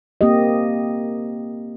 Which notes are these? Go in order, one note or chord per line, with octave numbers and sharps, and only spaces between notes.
A#3 C4 G4 D#5